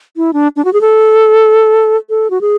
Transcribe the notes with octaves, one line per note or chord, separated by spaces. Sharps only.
E4
D4
D4
F#4
G#4
A4
A4
F#4
G#4